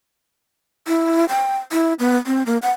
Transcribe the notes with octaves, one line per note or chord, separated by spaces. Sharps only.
E4
G5
E4
B3
C4
A#3
F#5